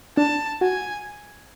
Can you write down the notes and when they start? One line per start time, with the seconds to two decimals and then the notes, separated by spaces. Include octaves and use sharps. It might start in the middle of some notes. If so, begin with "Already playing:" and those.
0.17 D4 A5
0.61 F#4 G#5